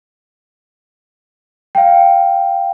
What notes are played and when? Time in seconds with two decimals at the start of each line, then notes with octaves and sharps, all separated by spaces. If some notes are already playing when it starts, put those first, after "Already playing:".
1.75 F5 G5